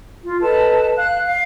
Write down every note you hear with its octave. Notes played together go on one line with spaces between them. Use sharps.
F4
A4 B4 D#5 A5
F5 F#6
F5